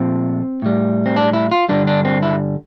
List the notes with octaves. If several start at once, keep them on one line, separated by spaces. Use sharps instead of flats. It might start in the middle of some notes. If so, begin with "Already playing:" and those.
Already playing: A#2 F3 A3 C4
A2 G3
C4
D4
E4
F4
G2 D3 G3 D4
D4
C4
E4